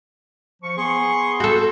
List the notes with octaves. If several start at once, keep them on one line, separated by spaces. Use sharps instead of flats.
F3 C#6
B3 G#4 C6 C#6
F#4 A4 G6